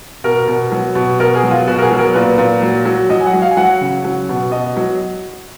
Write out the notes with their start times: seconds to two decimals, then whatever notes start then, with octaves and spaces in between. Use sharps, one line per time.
0.24 B2 A#4
0.48 B2
0.72 F#3
0.95 B2
1.19 B2 A#4
1.35 G#4
1.43 F#3
1.51 F4
1.67 B2 F#4
1.78 A#4
1.82 G#4
1.91 F#3
1.99 A#4
2.14 A#2 B4
2.38 A#2
2.62 F#3
2.85 F#3
3.09 F#3 D#5
3.20 G#5
3.26 F#5
3.33 F#3
3.42 F5
3.51 G#5
3.57 F#3 F#5
3.81 C#3
4.04 F#3
4.29 B2
4.52 B2 D#5
4.76 F#3